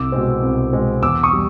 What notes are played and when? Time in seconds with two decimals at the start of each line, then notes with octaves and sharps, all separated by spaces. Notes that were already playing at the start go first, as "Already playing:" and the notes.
Already playing: C2 D6 E6
0.12 B2 G#3 C4
0.42 C2
0.73 B2 G#3 C4
1.03 E2 D6 E6
1.23 C#6 D#6
1.33 G3